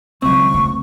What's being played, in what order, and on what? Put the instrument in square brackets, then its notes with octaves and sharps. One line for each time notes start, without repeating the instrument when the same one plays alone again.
[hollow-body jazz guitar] C#2 C4 [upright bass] D#3 F#3 [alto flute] C#6
[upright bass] A3